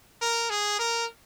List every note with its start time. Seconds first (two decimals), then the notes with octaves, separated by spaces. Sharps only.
0.22 A#4
0.50 G#4
0.79 A#4